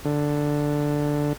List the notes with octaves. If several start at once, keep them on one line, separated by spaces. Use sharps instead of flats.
D3